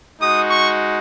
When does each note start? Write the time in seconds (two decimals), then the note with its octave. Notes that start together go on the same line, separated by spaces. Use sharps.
0.21 G#3 D#4 F#4 D#6
0.50 C#6